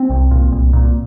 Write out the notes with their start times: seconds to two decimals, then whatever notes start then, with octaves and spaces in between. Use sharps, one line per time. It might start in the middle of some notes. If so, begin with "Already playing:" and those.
Already playing: C4
0.10 C2
0.31 A#2
0.52 C2
0.73 A#2